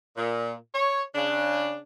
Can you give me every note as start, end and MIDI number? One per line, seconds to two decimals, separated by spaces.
0.16 0.54 46
0.74 1.02 73
1.14 1.78 49
1.14 1.78 62